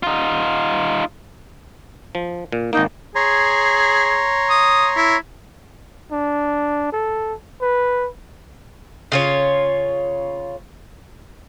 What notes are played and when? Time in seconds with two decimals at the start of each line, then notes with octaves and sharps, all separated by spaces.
0.03 D#4 F4
2.15 F3
2.52 A#2
2.73 G#1 A#3 D#4
3.15 G#4 C#5 A#5 C6
4.50 D#6
4.96 E4
6.12 D4
6.92 A4
7.61 B4
9.12 C#3 F4 C#5